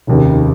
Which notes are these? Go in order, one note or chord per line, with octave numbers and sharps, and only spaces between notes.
F1 D#2 C#3